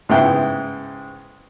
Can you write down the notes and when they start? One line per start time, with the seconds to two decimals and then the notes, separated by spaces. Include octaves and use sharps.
0.09 G#2 C#3 B3 E4 G5